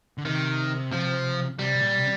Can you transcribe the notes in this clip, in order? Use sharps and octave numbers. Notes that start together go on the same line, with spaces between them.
D3
C3 D#3
F3
C3 G3
C3
A#2
C3